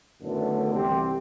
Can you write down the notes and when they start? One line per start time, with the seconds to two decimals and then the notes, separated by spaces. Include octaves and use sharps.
0.22 F#2 A2 D3 D#3 A3 B3
0.74 C2 E3 C4 G4